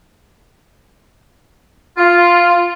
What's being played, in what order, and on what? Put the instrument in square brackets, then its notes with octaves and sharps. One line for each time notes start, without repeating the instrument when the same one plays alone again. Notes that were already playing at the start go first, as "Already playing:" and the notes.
[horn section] F4